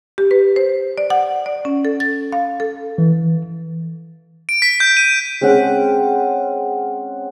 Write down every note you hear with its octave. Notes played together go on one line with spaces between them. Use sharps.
G4
B4
C5
D5
F#5
D5
C#4
A4
A6
F5
A4
E3
D7
B6
G6
D#7
G#3 C4 C#4 F#5